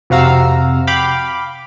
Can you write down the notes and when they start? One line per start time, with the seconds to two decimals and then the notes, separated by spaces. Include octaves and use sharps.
0.10 F2 C3 F#4 F5 A#5 E6
0.87 F5 G5 B5 D6